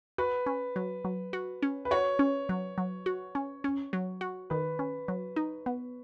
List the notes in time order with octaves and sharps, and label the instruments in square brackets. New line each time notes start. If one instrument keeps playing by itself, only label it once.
[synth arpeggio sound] F#4 [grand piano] B4
[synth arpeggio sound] C#4
F#3
F#3
F#4
C#4
[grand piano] B4
[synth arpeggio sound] F#4 [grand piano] C#5
[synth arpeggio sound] C#4
F#3
F#3
F#4
C#4
C#4
F#3
F#4
[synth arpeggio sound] D#3 [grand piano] B4
[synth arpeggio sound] C#4
F#3
D#4
B3